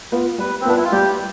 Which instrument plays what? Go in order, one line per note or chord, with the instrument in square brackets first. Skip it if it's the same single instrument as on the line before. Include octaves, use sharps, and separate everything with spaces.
[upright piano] B3 F4 B4
[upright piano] G3 [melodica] B4
[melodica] C4
[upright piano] B3 F4 B4 [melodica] D4
[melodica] E4
F4
[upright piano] G3 [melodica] G4